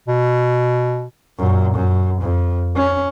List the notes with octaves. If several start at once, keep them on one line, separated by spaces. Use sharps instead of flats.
B2
F#2 A#2
F#2
F2
C#4